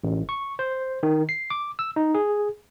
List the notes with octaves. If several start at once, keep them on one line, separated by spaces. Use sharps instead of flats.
A1
C#6
C5
D#3
C7
D6
E6
D#4
G#4